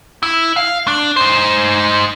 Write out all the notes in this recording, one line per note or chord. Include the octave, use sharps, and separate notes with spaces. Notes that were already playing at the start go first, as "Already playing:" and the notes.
E4
F5
D4
D#4 C5